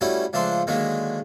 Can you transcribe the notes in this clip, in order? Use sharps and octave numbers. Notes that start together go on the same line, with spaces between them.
G3 A3 C#4 E4 F#4
C#2 F3 A3 D4 A4 C6
D3 D#3 F#3 G#3 A#3